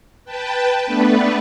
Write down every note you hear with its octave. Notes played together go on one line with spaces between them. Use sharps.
B4 G5 A5
A3 B3 D4 B4